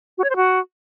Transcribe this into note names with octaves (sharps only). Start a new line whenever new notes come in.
F#4
C#5
C5
F#4